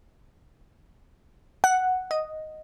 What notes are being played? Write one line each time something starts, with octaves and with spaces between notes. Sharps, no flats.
F#5
D#5